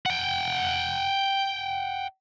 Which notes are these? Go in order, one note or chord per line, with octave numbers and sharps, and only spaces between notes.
F#5 G5